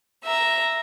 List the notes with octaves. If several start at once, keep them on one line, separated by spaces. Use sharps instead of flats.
E5 A#5